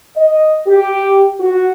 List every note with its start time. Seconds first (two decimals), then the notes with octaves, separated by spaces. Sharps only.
0.16 D#5
0.67 G4
1.39 F#4